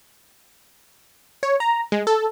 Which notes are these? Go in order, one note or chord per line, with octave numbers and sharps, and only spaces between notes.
C#5
A#5
G#3
A4